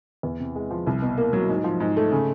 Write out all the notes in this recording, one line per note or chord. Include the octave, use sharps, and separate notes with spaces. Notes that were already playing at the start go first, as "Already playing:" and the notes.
E2
C3
G#3
F3
C2
B2
A#3
F#3
G#2
F3
G#2
A3
C#3